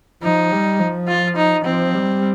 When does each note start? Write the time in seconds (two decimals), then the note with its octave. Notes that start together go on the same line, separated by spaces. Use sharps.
0.22 F3 D#4
0.52 G3
0.79 F3
1.08 F4
1.36 D#4
1.65 F3 C4
1.94 G3